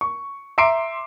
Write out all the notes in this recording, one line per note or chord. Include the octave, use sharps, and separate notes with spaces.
C#6
E5 A#5 C6 D6 C7 D7